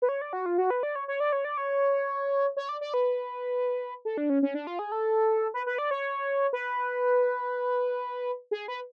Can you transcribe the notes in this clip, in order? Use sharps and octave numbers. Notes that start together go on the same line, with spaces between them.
B4
C#5
D5
F#4
F4
F#4
B4
D5
C#5
C#5
D5
C#5
D5
C#5
C#5
D5
D5
B4
A4
D4
C#4
C#4
D4
F4
G#4
A4
B4
B4
D5
C#5
B4
G#4
B4